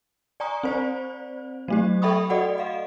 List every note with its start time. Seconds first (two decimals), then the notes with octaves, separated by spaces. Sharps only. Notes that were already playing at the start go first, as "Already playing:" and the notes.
0.40 D5 G#5 A#5 C#6 D#6
0.63 C4 C5 D5
1.68 F#3 A3 G4
2.02 A4 E5 G5 B5 C#6 D#6
2.30 F#4 A4 D5 D#5 F#5
2.58 D#5 F5